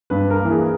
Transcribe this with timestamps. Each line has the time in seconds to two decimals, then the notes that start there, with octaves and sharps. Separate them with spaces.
0.10 G2 B4
0.30 A#4
0.40 E3 A#3
0.51 G#4